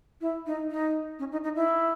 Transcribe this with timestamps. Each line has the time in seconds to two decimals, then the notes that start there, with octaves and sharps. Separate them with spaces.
0.21 E4
0.46 D#4
0.70 D#4
1.19 C#4
1.32 D#4
1.44 D#4
1.56 E4